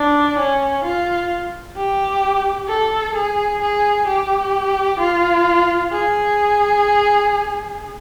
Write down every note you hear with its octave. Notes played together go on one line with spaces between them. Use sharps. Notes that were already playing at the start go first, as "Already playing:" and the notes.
Already playing: D4
C#4
F4
G4
A4
G#4
G#4
G4
F4
G#4